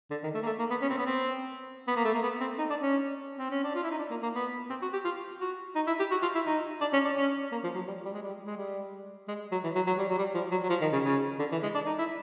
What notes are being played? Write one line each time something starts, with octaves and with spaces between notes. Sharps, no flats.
D3
D#3
A3
A#3
A3
A#3
B3
C#4
C4
B3
C4
B3
A#3
A3
A#3
B3
C4
D#4
D4
C#4
C4
C#4
D4
F4
E4
D#4
D4
A#3
A#3
B3
C4
F#4
G4
F4
F#4
D#4
E4
G4
F#4
F4
E4
D#4
D4
C#4
D4
C#4
A#3
F3
F#3
G3
G3
G#3
G3
G#3
G3
G#3
F#3
E3
F#3
F#3
G3
F#3
G3
F3
F#3
F#3
F3
D#3
C#3
C#3
D3
E3
G#3
D4
D#4
E4